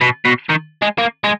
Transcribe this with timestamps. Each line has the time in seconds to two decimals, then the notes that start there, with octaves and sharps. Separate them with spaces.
0.01 B2
0.25 B2
0.50 D#3
0.82 G#3
0.98 A#3
1.24 G#3